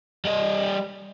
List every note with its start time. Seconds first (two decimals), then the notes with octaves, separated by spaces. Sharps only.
0.25 G3 D#5